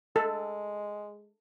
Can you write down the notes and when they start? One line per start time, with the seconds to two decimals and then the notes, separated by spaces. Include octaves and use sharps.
0.16 G#3 A4